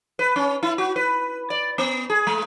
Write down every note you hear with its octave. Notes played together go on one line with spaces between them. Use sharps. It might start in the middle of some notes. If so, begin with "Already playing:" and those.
B4
C#4
E4
F#4
B4
D5
B3
G#4
G#3